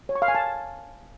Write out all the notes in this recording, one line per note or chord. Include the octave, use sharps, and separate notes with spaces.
C#5
C#6
F5
G#5
A5